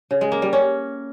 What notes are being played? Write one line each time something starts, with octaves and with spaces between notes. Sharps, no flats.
C#3
G#3
A#3
G3
C#4